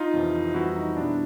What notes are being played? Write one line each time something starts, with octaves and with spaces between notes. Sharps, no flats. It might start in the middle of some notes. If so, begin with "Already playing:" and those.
Already playing: D#4 F4
F2 C3 E3
F2 C3 E3 G3 E4 F#4
D#4
B2 G3 D4 E4